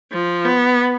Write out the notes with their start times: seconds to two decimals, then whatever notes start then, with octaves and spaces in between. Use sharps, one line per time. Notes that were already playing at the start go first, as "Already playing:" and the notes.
0.12 F3
0.45 B3